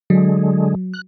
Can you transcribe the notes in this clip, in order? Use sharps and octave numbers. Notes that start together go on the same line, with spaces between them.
D3 F#3 G#3
F#6